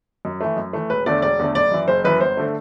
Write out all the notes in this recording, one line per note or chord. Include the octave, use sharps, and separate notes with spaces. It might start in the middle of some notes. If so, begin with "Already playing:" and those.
F#2
E3 A3
F#2
E3 A3
E1 B4
E2 D3 A3 D5
E1 D5
E2 D3 A3
F#1 D5
F#2 E3
F#1 C5
F#2 E3 B4
G1 C5
D3 A3